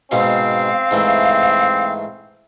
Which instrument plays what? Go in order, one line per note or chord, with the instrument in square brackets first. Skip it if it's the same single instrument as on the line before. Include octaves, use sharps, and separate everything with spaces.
[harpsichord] G#2 B2 [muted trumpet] C4 [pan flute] F5
[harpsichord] G#2 E3 A3